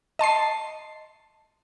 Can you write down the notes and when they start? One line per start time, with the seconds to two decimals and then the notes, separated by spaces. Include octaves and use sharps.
0.19 D#5 A5 C6 C7